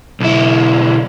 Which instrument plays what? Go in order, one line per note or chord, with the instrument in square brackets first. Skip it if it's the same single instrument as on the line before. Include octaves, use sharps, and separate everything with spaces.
[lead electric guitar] B1 E4